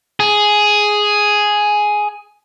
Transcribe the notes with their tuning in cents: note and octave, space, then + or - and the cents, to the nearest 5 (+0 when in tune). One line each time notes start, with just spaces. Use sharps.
G#4 +5